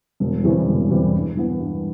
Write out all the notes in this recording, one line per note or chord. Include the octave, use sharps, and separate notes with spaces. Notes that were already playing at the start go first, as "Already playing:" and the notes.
E1
E2 C3 E3 G3
E1
E2 C3 E3 G3
G2
E3 B3
G2